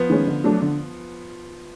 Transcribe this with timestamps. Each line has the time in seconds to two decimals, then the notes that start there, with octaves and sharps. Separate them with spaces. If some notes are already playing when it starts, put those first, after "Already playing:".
Already playing: F3 B3
0.10 D#3 G#3 C#4
0.27 D3
0.44 F#3 A3 D4
0.62 D3